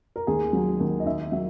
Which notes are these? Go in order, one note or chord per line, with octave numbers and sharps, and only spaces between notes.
A#4
D#2 G#4
F#3
D#2
D#5
D#3 E5
F#3 E5